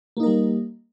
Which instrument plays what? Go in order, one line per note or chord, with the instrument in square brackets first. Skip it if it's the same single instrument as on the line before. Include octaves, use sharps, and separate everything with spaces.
[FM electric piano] A#3
D#4
A#4
G3